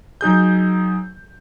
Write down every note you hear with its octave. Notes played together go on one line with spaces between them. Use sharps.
F#3 D#4 G#4 G6